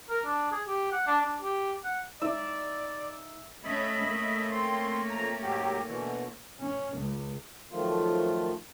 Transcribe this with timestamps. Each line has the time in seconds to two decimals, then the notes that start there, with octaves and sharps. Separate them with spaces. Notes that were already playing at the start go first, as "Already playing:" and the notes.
0.09 A#4
0.25 D4
0.52 G#4
0.66 G4
0.92 F#5
1.07 D4
1.21 D4
1.42 G4
1.84 F#5
2.22 D#4 D5 E5
3.64 A3 C#4 D#5 E5 B5
4.07 A3 A#3 C#4
4.51 C4 C6
5.10 F2 A#5
5.41 G#2 F#3 G4
5.87 B2 D3 E3
6.61 C#4
6.97 C#2
7.71 F#2 D#3 F3 A3 F4